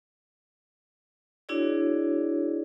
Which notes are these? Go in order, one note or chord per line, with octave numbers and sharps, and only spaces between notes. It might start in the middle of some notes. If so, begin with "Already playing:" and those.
D4 E4 F#4 G#4 C#5 D5